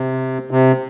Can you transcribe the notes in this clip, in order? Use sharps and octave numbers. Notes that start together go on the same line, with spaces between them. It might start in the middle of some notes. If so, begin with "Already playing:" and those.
Already playing: C3
C3